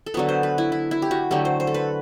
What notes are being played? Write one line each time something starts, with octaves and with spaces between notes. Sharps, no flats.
A4
D3 F#3 B3 B4
C5
B4
E4
E4
E4
G4
F#4
D3 F#3 A3 G4
C5
C5
A4
B4